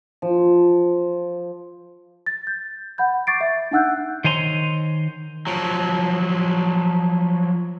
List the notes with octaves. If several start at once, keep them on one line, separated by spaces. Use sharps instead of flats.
F3
A6
G6
F#5 B5 G6
C#6 D6 A6 C7 D7
E5
D4 D#4 F#5 E6 F#6 G6
D#3 C5 C#5 G#5 A#5 C6
F3 F#3